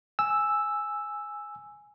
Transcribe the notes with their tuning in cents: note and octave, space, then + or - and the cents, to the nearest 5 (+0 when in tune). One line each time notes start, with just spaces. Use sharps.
G#5 +0 E6 +0